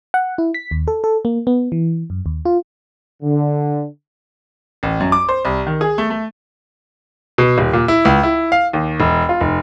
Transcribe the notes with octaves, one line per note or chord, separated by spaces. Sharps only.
F#5
E4
B6
D#2
A4
A4
A#3
B3
E3
F#2
D#2
F4
D3
A1
F#2
D6
C5
C2
D#3
G#4
A3
A3
B2
D#1
A#2
E4
C#2
E4
F5
D#2
E1
F4
F1